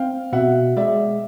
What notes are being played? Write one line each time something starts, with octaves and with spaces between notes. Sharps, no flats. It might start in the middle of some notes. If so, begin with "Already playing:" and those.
Already playing: C4 F5 G5
B2 E5 F#5
G#3 D5 E5